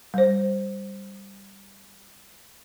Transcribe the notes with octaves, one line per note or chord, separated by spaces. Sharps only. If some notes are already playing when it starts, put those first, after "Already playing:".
G3 C5